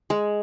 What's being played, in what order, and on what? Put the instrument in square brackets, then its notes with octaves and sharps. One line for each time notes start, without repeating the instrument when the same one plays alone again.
[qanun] G#3